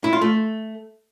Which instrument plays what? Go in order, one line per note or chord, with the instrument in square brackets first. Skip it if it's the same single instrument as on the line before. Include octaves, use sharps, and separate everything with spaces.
[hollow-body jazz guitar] E4
F4
A3